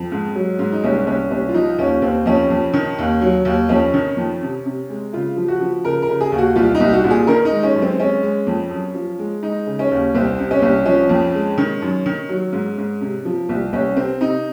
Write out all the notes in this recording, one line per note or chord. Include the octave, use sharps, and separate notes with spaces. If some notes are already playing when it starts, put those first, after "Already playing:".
Already playing: F2
G#2
F#3
G#2
D#4
C2 C#4
C2 C#4
C2 C#4
F4
F3 D#4
D#2 C#4
D#2 C4
F2 C#4
F2
D#3
D#2
F#3
D#2
F2 C#4
D#3
F2
C3
C3
G#3
C#3 F4
F3
F#4
F3
C#3 A#4
A#4
C#3
G#4
D#2
F#4
C2 F4
D#4
C2
F#4
A#2
G#4
D#3 A#4
D#4
G#3
C#4
F#2
C4
G#3 C#4
G#3
F2
F#2
F3
G#3
G#3 D#4
C#3
C#4
D#2
C2 C4
C3
C#4
C2
F3 C#4
F2
G#3
D#3
F#2
D#3
F#3
G#2
G#2
C3
F3
C2
C2 C#4
C3 C4
C3 D#4